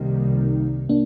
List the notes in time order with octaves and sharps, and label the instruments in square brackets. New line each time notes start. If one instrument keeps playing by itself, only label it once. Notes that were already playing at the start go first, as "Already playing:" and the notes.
Already playing: [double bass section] C2 C3 D#3 G3 A#3 [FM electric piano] D#4
[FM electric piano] A#3 D4